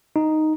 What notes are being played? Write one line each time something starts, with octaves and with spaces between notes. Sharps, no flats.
D#4